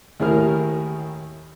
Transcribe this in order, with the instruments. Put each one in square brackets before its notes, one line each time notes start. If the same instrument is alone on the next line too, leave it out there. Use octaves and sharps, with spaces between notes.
[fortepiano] D#2 A2 E4 G#4 A#4 F6